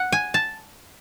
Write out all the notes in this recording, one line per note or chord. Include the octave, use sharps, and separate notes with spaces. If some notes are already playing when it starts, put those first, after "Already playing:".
Already playing: F#5
G#5
A5